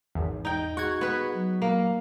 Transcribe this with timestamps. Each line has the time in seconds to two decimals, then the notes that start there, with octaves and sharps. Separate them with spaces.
0.15 G#1 E2
0.45 D#4 G5
0.77 F#4 G#4 C#6 G#6
1.01 B3 B4
1.34 F#3
1.62 A#3